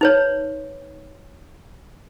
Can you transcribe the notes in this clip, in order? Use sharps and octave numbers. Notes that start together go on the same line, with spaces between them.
D#4 B4 C#5